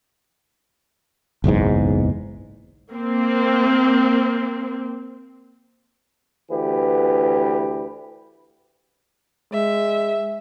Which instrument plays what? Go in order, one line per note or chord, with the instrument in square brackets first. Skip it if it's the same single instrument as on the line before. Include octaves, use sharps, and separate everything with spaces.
[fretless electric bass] F#1 B1 E2 G#2
[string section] A#3 C4
[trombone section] D2 E3 G4 B4
[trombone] G#3 [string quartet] E5